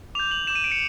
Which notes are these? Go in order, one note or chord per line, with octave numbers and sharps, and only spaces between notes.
D6 G6 F7
F#7
D6 G6 E7
D#7
D7
C#7